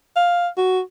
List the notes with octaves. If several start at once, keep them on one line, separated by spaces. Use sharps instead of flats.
F5
F#4